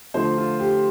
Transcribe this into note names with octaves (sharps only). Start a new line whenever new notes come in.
D3 F3 A3 C5
F4
G4